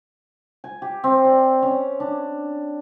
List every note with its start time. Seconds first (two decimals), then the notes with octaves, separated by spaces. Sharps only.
0.64 G#5
0.82 G4
1.04 C4
1.25 D5
1.62 C#4
2.00 D4